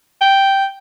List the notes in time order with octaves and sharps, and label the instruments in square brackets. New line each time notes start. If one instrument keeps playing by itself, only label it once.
[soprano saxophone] G5